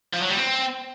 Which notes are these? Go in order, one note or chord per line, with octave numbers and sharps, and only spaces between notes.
F3
F#3
G3
C4